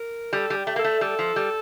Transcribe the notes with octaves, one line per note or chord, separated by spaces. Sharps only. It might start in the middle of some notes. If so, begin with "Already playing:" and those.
Already playing: A#4
G3 A4
G3 G4
A3
A#3 A4
A3
G3 A4
F3
G3